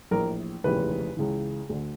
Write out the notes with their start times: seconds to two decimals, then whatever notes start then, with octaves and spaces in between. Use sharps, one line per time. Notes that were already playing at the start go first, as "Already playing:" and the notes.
0.11 A#1 A2 E3 A#4
0.64 F1 D#2 C#3 E3 B4
1.17 C#2 C#3 E3
1.69 D2 D3